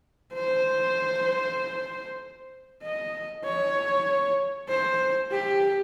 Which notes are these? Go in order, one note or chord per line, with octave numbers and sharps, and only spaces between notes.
C5
D#5
C#5
C5
G4